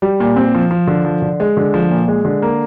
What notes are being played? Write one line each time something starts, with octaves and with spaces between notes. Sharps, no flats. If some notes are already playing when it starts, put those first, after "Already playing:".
G3
A#2
C4
F3
F3
D3
F3
D3
G#3
D3
F3
A#2
G#3
D3
A#3